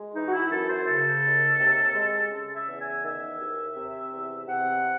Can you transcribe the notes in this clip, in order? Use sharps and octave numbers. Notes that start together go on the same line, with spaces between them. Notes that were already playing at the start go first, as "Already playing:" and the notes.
Already playing: G#3
E3 D#4
F#4
E4
F#2 A4
C5
C#3 A4
D#2
C3
G#3
C#3
E5
E2
G#5
D#3 E5
D#2
C3
E2
C3 F#5